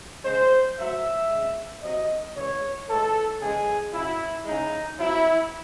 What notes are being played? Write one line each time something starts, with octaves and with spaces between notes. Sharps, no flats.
C#3 G#3 C5
A2 F#3 E5
C#3 G#3
C3 F#3 D#5
C#3 E3 G#3 C#5
A2 E3 G#3 A4
C#3 E3 G#3 G#4
C#3 F#3 E4
C#3 G#3 D#4
C3 F#3 E4